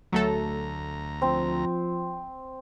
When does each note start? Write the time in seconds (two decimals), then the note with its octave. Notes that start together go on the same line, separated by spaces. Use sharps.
0.13 D2 F#3 A3 A4 A#5
1.22 F3 C4